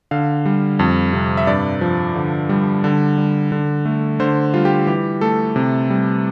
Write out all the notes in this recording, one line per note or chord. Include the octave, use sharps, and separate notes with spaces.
D3 F5
G3
F2
C3
E5
G2 D5
F3
D3
G3
D3
G3
D3
A3
D3 C5
G3 F4
G4
E3 G4
A3 A4
C3
G3